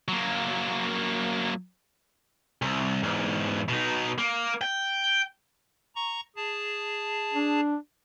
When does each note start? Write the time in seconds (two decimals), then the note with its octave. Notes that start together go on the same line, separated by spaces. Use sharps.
0.08 F#3 A#3
2.62 C2
3.03 E2 G#2
3.69 B2 D#4
4.18 A#3
4.61 G5
5.96 A#5 C#6
6.36 G#4 A5
7.34 D4